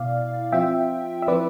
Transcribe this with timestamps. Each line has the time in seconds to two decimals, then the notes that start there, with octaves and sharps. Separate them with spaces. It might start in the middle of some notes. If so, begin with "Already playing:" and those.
Already playing: B2 B3 E4 D5 F5
0.52 F3 C4 F4 E5 G5
1.22 E5
1.28 F3 C4 E4 B4 D5